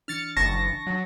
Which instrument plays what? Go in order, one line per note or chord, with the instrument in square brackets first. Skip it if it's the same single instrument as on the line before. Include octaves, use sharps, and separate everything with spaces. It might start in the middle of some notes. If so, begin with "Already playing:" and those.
[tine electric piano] E3 D4 [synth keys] F6 A6 C#7
[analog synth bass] F#1 [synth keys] A5 C#6 [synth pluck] A#6
[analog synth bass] F#3